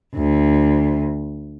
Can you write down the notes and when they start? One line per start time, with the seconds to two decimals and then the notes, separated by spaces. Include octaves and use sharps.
0.15 D2